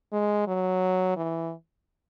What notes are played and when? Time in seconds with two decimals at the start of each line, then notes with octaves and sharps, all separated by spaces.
0.13 G#3
0.47 F#3
1.16 E3